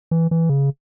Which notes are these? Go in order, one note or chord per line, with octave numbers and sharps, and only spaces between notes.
E3
E3
C#3